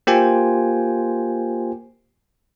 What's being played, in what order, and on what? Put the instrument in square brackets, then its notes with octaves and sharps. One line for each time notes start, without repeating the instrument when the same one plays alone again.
[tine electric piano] A#3 F4 G4 C5 G5 G#5